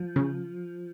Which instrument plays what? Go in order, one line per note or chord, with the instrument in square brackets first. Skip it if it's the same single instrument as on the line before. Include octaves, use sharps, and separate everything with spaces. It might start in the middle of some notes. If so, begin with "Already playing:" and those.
Already playing: [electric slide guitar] F3
[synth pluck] C#3